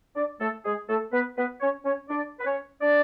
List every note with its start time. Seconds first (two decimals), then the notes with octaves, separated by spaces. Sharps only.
0.16 D4 D5
0.40 A3 A4
0.65 G#3 G#4
0.88 A3 A4
1.13 B3 B4
1.37 B3 B4
1.61 C#4 C#5
1.85 C#4 C#5
2.09 D4 D5
2.39 B4
2.45 C#4 C#5
2.81 D4 D5